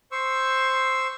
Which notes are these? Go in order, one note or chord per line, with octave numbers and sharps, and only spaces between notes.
C5 C#6 E6